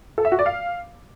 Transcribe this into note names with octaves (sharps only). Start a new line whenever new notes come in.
A4
E5
F#4
D5
F5